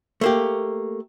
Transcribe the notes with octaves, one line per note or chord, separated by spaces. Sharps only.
A3 A#3 G4